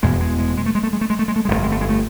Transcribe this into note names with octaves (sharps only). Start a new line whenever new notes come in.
F1 E2 B2 G#3
G#3
G#3
G#3
A3
G#3
A3
G#3
A3
G#3
A3
G#3
A3
G#3
G1 F2 D3
A3
G#3
A3
G#3
A3